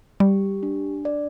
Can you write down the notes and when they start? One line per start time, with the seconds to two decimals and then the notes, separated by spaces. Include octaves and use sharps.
0.20 G3 G4
0.63 D4
1.05 D5